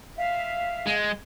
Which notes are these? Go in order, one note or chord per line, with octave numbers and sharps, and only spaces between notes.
E5 F5
G#3